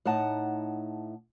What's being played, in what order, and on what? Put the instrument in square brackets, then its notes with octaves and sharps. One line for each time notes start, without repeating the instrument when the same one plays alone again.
[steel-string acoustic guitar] A2 D#4 F#5 A5